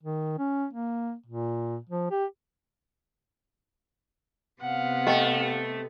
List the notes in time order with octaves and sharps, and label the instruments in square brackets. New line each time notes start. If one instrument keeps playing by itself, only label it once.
[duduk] D#3
C#4
A#3
A#2
F3
G4
[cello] C3 B3 [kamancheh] F5 F#5
[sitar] A3 [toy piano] G4 D#5 G5